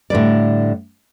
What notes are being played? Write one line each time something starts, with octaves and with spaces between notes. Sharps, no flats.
A2 D3 G3 D5